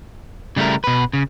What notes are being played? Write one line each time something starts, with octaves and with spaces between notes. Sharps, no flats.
C#3 G3 A3 E4 A#4
B2 B4
C#3